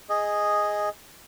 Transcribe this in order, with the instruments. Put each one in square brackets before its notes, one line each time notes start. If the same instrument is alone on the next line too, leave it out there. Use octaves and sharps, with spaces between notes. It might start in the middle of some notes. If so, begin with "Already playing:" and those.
[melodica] G#4 D#5